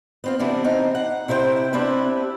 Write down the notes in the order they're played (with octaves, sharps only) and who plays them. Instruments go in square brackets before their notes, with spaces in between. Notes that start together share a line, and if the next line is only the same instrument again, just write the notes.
[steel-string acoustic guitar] B3 C4 F4
C3 E3 B3 D4
C4 D#4
F#5
C3 E4 C5 D#5 G5
C4 D4 E4 G4 B4